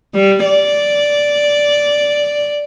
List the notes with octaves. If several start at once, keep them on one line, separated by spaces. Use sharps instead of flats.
G3
D5